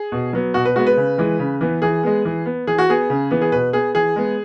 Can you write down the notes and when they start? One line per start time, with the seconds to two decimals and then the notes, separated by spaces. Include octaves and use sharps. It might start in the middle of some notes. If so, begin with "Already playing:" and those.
Already playing: G#4
0.12 B2
0.33 F#3 B3
0.54 B2 F#4
0.65 B4
0.76 G#3 B3 F#4
0.87 B4
0.97 C#3
1.18 E3 G#3
1.39 C#3
1.61 E3 B3
1.82 E3 G#4
2.03 G#3 B3
2.25 E3
2.46 B3
2.67 E3 G#4
2.78 F#4
2.89 B3 G#4
3.10 C#3
3.31 E3 B3
3.41 G#4
3.52 B2 B4
3.73 B3 G#4
3.95 E3 G#4
4.16 G#3 B3